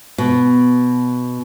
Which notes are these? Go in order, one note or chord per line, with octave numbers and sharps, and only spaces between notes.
B2